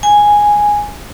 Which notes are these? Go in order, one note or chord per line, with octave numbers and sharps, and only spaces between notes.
G#5